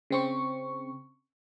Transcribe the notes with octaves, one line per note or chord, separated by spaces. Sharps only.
C#3 C4 C#6